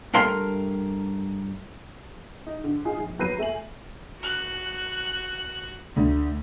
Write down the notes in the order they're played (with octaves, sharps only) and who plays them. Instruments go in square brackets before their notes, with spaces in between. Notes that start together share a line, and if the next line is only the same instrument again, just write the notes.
[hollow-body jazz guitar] G2 A3 A#4 F5 C6
[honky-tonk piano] D#4
D3
D#4 F4 G#4
A#1
F#3 B4 G6 A#6 C7 D#7
A3 E5 G#5 F#7
[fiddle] F#4 F#6
[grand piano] D2